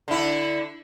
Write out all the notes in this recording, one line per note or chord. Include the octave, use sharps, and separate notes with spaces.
D3 E4